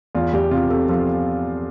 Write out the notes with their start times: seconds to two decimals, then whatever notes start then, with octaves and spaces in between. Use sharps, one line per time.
0.15 E2 F4
0.33 E2 G4
0.51 C3 F4
0.70 C3 A4
0.89 F3 A4